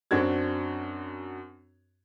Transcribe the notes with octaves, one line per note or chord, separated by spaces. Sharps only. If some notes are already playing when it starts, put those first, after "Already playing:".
F#2 C4 D4 F#4 G#6